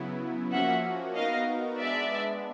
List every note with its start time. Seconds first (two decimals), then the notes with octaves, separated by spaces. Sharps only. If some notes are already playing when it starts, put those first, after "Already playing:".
Already playing: C#3 F#3 B3 E4
0.52 F3 A#3 C#4 F#4 E5 F#5
1.15 B3 D#4 F#4 A#4 D#5 F5
1.79 G#3 B3 D4 D5 E5